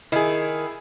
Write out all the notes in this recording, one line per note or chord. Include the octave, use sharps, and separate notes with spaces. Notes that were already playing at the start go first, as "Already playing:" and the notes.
D#3 E4 G#4